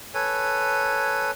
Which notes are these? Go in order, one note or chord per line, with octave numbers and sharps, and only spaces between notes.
A4 B4 C#5 G#5